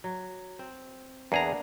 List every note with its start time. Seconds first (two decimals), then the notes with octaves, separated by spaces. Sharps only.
0.04 F#3
0.59 C4
1.32 E2 A#3 B3 D4 G#4 A#5